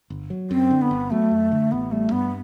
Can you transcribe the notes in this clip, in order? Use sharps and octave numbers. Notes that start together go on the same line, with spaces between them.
G1
F#3
F#2 C4
D3
B3
G1
F#3 A3
F#2
D3
A1 B3
G3 A3
G2 B3